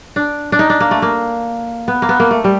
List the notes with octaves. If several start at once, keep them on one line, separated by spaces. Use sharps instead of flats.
D4
D4
D#4
D4
A#3
A3
A#3
B3
A#3
B3
A#3
A3
G3